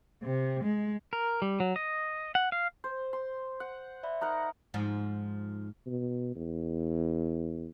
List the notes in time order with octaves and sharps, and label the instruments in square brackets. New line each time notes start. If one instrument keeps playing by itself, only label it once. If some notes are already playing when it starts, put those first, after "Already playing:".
[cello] C3
G#3
[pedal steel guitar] A#4
G3
F#3
D#5
F#5
F5
[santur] C5
C6
F#5
[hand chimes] D5 E5 B5
[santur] D#4 A#4 F#5
[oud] G#2 F3
[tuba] B2
E2